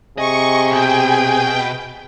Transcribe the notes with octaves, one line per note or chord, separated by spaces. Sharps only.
C3 G#4 D#5 C#6
B2 G5